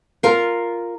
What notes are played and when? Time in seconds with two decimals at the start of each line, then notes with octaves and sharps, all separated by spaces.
0.23 F4 A#4